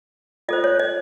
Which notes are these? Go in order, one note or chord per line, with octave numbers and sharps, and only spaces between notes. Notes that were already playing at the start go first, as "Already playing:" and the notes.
F4 A4 C5 D#5
C#5
D#5